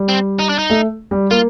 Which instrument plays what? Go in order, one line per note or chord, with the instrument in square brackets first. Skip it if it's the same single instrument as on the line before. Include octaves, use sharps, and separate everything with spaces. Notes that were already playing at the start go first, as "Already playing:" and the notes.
Already playing: [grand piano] G3
[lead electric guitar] C4
D#4
D4
D#4
[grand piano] A3
G3
[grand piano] A#3 [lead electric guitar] F4